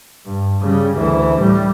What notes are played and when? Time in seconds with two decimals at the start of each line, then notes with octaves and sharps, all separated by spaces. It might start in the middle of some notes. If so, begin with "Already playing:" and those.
0.25 G2
0.62 C#3 G3
0.98 D2 E3
1.39 A2 G3